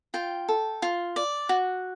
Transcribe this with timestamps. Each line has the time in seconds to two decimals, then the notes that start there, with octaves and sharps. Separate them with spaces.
0.14 F4 G5
0.48 A4
0.82 F4
1.16 D5
1.49 F#4